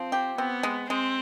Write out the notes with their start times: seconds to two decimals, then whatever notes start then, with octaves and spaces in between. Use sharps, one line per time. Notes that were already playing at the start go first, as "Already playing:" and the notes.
Already playing: F3 C4
0.12 G4
0.38 B3 C4
0.63 G#3
0.90 G#3 C4